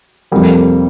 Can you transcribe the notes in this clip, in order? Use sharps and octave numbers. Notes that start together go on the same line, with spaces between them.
F2 C3 G3 A#3